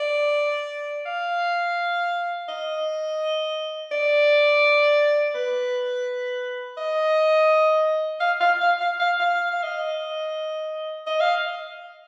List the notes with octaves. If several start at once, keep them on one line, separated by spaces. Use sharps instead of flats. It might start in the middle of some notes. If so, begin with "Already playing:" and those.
Already playing: D5
F5
D#5
D5
B4
D#5
F5
F5
F5
F5
F5
F5
F5
D#5
D#5
F5